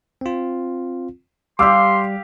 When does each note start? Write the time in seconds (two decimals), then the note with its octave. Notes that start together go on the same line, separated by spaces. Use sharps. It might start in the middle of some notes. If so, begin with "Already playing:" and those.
0.21 C4 F4
1.59 G3 G4 F5 C6 D6 E6